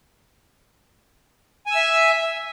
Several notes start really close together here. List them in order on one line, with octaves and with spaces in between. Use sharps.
G#5 E6 E5